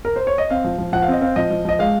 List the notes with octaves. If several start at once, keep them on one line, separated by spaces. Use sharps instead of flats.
A#4
C5
C#5
D#5
C4 F5
F3
F3
F3 F#5
F5
C4 D#5
C4 F5
F3 D#5
F3
F3 D#5
G#3 F5